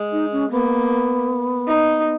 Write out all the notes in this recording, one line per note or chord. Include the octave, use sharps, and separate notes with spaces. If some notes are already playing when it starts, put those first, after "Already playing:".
Already playing: G#3
D#4
C#4
A#3 B3
D#4